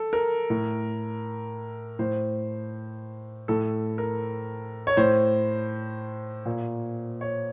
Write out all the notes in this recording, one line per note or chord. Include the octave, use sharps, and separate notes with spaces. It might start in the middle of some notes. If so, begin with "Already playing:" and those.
Already playing: A4
A#4
A2
A2 C5
A2 A4
A#4
C#5
A2 C5
A#2
C#5